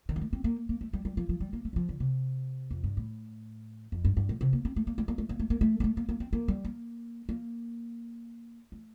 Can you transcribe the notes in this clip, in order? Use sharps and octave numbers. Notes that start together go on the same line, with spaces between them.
D#3
G3
A3
C4
A#3
A#3
A3
G3
G3
F3
F3
G3
A#3
A3
G3
F3
D3
C3
F2
G2
A2
F2
G2
G2
A2
C3
A#3
C4
A3
A#3
A3
A#3
A3
A#3
A3
A#3
A3
A#3
A3
A#3
A#3
C4
A#3
G3
A#3
A#3
A3